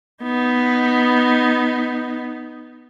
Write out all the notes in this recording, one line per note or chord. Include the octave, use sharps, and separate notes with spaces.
B3 D#4